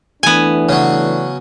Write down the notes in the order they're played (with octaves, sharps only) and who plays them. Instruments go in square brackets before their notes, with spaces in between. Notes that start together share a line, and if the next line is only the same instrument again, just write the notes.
[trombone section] E3 A3 D4 [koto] B3 G#5
[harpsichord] C#3 F#3